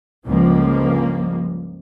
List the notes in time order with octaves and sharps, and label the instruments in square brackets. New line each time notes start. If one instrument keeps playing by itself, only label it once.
[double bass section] C#2 G2 D3 F3 G3 A#3